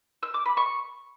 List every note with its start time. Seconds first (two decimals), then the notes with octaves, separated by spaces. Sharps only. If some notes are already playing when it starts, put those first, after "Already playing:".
0.23 E6
0.34 D6
0.46 B5
0.57 C#6